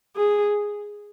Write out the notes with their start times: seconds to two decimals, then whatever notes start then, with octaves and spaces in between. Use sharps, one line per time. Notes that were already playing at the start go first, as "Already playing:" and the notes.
0.16 G#4